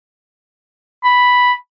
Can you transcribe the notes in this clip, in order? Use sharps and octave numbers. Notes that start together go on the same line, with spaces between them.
B5